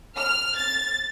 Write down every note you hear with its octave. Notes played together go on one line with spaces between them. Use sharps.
F6
A6